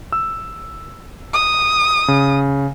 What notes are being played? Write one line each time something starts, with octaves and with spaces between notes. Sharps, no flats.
E6
D#6
C#3